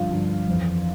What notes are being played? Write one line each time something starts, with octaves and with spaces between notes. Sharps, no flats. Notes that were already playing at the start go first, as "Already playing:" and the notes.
Already playing: G2 D3 F3 F4
G2 D3 F3
F2 E3